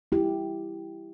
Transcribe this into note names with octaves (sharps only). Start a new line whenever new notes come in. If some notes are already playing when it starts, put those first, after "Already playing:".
E4 G4